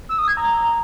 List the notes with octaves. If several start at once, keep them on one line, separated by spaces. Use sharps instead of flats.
E6
D#6
G#6
A#5